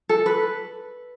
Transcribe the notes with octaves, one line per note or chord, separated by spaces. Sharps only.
A4
B4